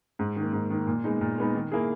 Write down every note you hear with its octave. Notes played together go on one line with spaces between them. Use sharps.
G#2
D#3 A#3
G#2
D#3 A#3
A#2
G#3 B3 D#4
A#2
G#3 B3 D#4
D#3
A#3 E4 G#4